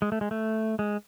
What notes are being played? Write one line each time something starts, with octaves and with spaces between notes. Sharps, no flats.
G#3
A3
G#3
A3
G#3